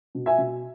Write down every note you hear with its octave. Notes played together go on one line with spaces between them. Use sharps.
B2
E5 G#5
B2